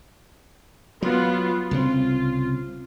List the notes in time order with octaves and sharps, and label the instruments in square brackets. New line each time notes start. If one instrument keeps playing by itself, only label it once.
[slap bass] F#3 [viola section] B3 F4
[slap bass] C2 C#3 C4 [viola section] F4